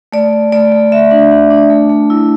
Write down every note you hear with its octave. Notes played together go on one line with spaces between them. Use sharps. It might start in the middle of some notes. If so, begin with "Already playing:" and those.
A3 D5
A3
A3 D5
A3
A3 E5
D4
D4
D4
A3
A3
E4